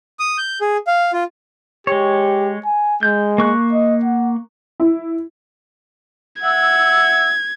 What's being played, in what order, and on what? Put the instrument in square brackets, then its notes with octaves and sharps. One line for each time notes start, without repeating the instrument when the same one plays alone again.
[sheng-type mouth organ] D#6
G6
G#4
F5
F4
[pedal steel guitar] G#3 C#5 [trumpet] G4
[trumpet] G#5
[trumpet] G#3 [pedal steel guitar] G6
[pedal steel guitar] A#3 C#6 F#6
[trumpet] D#5
F#5
[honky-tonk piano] E4
[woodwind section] E5 F#5 E6 [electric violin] G#6